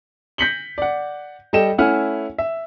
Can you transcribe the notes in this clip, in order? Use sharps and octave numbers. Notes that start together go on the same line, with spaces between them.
G6 A#6 B6 C#7 F#7 G7
D5 F#5
G3 A4 D#5 G5 E7
A3 C#4 E4 F#5 G#5 F6
E5